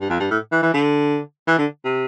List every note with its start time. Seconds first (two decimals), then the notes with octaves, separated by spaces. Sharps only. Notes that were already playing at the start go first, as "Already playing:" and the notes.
0.01 G2
0.09 F2
0.20 G2
0.31 A2
0.52 E3
0.63 E3
0.74 D3
1.48 E3
1.58 D3
1.85 C3